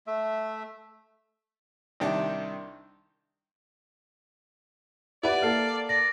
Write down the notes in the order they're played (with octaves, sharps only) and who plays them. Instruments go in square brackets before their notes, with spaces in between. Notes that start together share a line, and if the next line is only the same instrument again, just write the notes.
[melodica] A3 E5
[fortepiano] C2 C3 D#3 D4 G4
[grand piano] E4 B4 [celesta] G4 F#5 [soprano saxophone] D5
[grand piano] A#3 A4 [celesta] F6 C7
[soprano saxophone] D5 [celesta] A#6